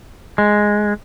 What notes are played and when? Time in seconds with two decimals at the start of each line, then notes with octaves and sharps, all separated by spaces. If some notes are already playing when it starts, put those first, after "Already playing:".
0.38 G#3